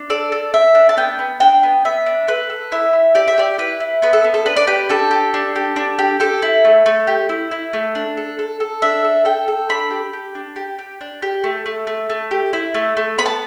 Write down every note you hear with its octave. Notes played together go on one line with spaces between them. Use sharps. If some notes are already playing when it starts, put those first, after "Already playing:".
Already playing: D4
A4 D5
A4
A4 E5
D4
A5
B3 G5
B3
D4 G5
B3
B3 E5
D4
A4 B4
A4
E4 E5
E4
G4 D5
E5
G4 D5
E4 B4
E4
B3 B4
A4
B3
A4
D4 B4
D5
G4 B4
D4 A4
G4
D4
G4
D4
G4
G4 A4
E4
A3
A3
G4
E4
E4
A3
D4
A4
A4
A4
D4 E5
A4
A4 G5
A4
D4 B5
G4
G4
D4
G4
G4
D4
G4
A3
A3
A3
A3
G4
E4
A3
A3
B3 B5
A5